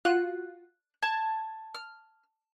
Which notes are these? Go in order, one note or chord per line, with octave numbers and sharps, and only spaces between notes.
F4 F#4 F#6
A5 G#6
F6